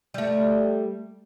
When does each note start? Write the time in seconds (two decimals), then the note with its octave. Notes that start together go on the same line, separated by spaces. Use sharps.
0.14 G3 A3